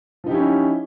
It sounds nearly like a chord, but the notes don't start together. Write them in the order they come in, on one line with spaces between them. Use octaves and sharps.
F3 D#4 G4 E4 C#4